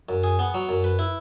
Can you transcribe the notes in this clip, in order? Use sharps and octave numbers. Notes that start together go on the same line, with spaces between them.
F#2
G#4
B3
F#3
F#2
B4
E4